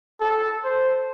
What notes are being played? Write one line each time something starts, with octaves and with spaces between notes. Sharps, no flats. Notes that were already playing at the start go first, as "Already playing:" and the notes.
A4
C5